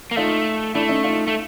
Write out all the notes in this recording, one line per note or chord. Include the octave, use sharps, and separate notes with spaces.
A#3
A3 D#4 F4
A3 D4 E4
C#4 D#4
D#4 F4
A3